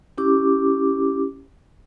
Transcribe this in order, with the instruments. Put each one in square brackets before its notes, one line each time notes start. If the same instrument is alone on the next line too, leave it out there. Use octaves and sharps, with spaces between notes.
[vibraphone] C#4 E4 G4 D6